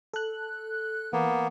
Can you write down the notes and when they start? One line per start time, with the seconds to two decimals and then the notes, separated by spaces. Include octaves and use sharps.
0.14 A4 F#6
1.13 E3 A#3 B3